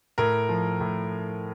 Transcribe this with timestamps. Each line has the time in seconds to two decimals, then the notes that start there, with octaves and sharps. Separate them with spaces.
0.18 A2 A#4
0.49 F3
0.81 A2